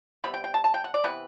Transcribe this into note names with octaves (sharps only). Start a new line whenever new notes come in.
C3 G3 B3 B5
G5
G5
A5
A5
G5
F#5
D5
C3 E3 B3 B4